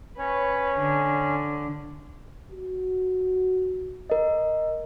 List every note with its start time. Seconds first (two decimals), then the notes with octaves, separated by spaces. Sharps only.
0.18 C#4 B4 C#5
0.79 D3
2.51 F#4
4.10 A#4 D#5